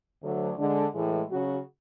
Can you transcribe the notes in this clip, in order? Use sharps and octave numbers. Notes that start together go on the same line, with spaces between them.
D2 D3 F#3
D3 G#3 D4
A2 E3 G#3
C#3 F#3 C#4 F#4